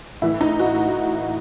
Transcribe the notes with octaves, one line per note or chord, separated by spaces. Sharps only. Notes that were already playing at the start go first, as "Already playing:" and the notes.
A2 E3 E4
D#4
F#4